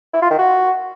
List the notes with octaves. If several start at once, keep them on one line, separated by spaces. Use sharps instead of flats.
E4
F4
D#3
F#4